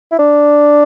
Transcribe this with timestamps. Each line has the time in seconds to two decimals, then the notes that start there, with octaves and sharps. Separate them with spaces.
0.12 E4
0.19 D4